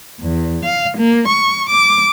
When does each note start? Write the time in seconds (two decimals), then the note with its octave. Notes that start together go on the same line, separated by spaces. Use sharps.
0.20 E2
0.64 F5
0.96 A#3
1.28 C#6
1.69 D6